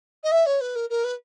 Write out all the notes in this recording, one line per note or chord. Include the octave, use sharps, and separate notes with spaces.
D#5
E5
C#5
B4
A#4
A#4
B4